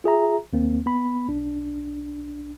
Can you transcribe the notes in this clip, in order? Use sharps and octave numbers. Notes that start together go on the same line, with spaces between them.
F4 G#4 E5 A#5
D#2 A#3 C4
B3 B5
B1 D4